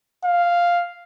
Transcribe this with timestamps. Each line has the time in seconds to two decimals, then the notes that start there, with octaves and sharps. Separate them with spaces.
0.25 F5